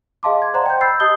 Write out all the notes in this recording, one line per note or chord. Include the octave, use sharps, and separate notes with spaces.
G#4 D#5 F5 A5 C6 D6
G#6
C5 D5 D#5 F#5 A#5 C6
G5 G6
B5 E6 G6 A6 C7
G4 D#5 A5 D#6 G6 G7